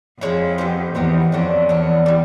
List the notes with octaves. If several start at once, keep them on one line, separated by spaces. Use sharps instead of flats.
F2 F3 G#3 C#4 E4
B3 D#4 G4 C5
E2 B3 D#4 G4 C5
F2 F#3 A3 D4
E2 F#3 A3 D4
E3 G3